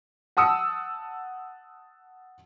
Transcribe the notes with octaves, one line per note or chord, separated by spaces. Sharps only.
F#5 A5 D#6 E6 C#7